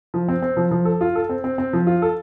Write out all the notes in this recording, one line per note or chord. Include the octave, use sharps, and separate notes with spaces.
F3
C4
C4
F3
F3
A4
F4
A4
C4
C4
C4
F3
F4
A4